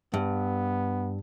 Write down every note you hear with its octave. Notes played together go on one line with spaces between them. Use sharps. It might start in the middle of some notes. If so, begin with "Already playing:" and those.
G2 B3